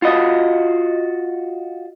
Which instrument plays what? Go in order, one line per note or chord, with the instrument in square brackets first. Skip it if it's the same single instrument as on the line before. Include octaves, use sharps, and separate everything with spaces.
[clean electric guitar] F4 F#4 D#5